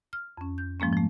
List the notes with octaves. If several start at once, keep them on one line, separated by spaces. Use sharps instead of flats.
F6
F2 C#4
G6
G#2 F3 G#3 A#3 C#4
F3 A3